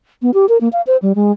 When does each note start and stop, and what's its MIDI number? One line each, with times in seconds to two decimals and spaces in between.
0.22 0.31 59
0.34 0.46 67
0.49 0.58 70
0.61 0.69 58
0.73 0.81 77
0.87 0.97 72
1.02 1.13 55
1.15 1.32 56